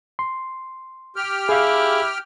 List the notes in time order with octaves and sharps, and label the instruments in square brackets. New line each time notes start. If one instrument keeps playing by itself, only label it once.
[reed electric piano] C6
[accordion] G4 G5 F6
[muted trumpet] E4 [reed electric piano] G#4 F5